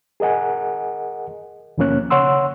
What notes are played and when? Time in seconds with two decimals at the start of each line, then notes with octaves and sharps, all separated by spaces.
0.20 G#4 A#4 D#5 F#5 G#5
1.78 D#2 B2 F3 A#3 C#4 F#6
2.10 C#3 C#5 F#5 C6 E6